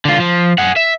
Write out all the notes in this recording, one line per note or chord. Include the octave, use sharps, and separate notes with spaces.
D3 F4
F3
G#4 F#5
E5